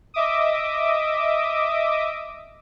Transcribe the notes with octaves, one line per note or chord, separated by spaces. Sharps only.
D#5 E5 D6 D#6